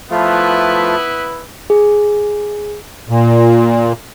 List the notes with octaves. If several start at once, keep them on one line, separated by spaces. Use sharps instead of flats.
F3 A3 B3 E4 F4 B4
G#4
A#2